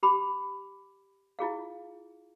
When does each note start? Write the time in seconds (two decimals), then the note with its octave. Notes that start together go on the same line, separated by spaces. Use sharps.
0.03 G4 B5 D6
1.39 E4 F4 G#4 F5